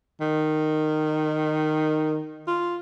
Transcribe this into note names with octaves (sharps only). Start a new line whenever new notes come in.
D#3
F4